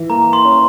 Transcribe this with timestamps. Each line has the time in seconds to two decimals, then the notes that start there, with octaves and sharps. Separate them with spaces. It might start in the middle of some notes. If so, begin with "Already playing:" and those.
Already playing: E3
0.10 A#3 A#5
0.33 C6
0.45 C#4